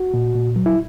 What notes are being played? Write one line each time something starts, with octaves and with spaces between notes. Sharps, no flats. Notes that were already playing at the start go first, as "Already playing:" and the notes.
Already playing: F#4
A#2
A#2
F#3
E4